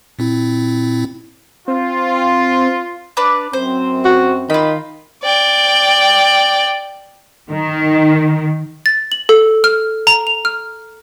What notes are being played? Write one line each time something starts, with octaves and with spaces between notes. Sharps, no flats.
A#2 C4 E4
C4 F4
D4 B4 D5
F#2 C4 C5
F#4
D#3 F4 B5
D5 G5
D#3
A6
F#7
A4
F6
A#5
F7
F6